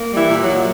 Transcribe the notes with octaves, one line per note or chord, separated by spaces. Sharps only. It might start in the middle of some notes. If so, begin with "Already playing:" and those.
Already playing: A#3
G3
E3 E4
A#2
F#3 F#4
A#2